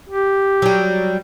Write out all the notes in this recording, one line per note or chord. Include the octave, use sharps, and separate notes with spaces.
G4
F#3 G3